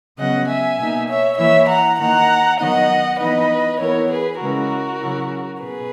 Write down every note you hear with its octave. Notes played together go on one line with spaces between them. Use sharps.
C#3 F#3 B3 D#5 F#5
E5 G#5
B2 A#3 D#4
C#5 E5
E3 A#3 E4 C#5 E5
F#5 A#5
D#3 A#3 D#4 F#5 A#5
D#3 F#3 B3 D#4 D#5 F#5
E3 B3 D#4 B4 D#5
E3 B3 E4 A#4 C#5
G#4 B4
C#3 G#3 C#4 E4 F#4 A#4
C#3 F#3 C#4 E4
B2 G#4 B4